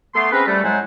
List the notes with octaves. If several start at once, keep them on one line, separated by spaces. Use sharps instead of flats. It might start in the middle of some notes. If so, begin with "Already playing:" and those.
A3 B3 C6
C4 C#4 G#4 A#4 B4
G3 A3
A2 F#3 G#3 C5 F#5 G#5